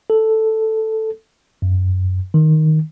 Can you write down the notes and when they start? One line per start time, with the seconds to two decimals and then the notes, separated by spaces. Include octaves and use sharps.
0.10 A4
1.62 F#2
2.34 D#3